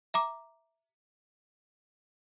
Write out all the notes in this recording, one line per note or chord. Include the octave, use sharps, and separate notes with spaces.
E5 A#5 D6